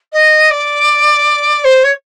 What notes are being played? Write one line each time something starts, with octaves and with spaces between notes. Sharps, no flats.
D#5
D5
C5
C#5